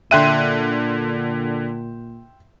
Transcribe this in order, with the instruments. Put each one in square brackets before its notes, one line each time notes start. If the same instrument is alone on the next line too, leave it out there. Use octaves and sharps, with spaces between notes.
[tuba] A#2 [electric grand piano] D3 F#6 D#7 [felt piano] E5 G5 C6